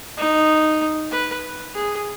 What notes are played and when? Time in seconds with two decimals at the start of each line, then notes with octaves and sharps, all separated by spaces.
0.17 D#4
1.11 B4
1.74 G#4